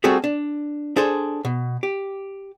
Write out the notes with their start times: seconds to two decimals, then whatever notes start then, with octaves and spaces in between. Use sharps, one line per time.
0.04 G3 A3 C4 F#4 G#4 A4
0.24 D4
0.96 D4 G#4 A4 C5
1.45 B2
1.83 G4